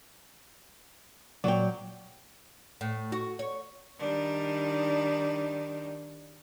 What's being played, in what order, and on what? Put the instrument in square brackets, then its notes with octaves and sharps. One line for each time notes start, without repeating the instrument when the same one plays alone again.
[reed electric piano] A#2 D5 [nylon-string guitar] F#3 G5
[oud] A2
F#4
C#5
[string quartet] D#3 G3 D4 D#4